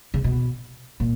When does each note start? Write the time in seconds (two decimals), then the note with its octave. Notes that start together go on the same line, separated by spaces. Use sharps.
0.14 C#3
0.24 B2
1.00 A#2